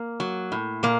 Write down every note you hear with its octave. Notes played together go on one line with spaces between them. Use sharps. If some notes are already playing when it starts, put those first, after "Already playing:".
Already playing: A#3
F#3
A2
A#2 A#3